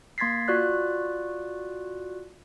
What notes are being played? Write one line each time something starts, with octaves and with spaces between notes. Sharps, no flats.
A#3 C6 G#6 A6 B6 C7
F4 F#4 D5 F#6